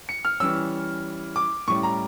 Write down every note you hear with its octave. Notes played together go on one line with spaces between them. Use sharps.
C#7
F6
E3 G3 C#4 E6
D6
A2 G3 C#4 C#6
A#5